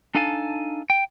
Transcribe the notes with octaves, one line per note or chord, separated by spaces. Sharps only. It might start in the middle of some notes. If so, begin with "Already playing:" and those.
D4 D#4 A4 F5 G#5 A5
G5